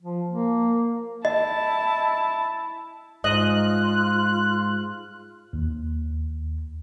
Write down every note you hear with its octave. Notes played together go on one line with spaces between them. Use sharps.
F3
A#3
E4 D#5 A5
G#2 F4 D#5 F#6
D#2